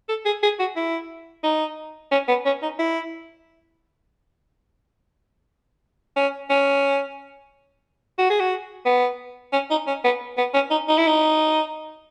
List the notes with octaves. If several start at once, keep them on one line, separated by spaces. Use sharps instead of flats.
A4
G#4
G#4
F#4
E4
D#4
C#4
B3
C#4
D#4
E4
C#4
C#4
F#4
G#4
F#4
B3
C#4
D#4
C#4
B3
B3
C#4
D#4
D#4
E4
D#4